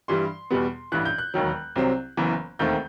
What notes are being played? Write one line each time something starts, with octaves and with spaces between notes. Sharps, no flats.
G2 E3 G3 C6
E2 B2 G3 B3
A1 G2 E3 F#6
G6
F#6
E1 D#2 D#3 F#3
C2 C3 F#3 C4
F#1 F#2 E3 B3
E1 D#2 D#3 A3 C4 G6